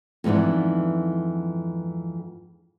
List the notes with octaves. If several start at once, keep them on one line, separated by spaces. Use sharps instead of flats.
F2 G#2 E3 B3 D4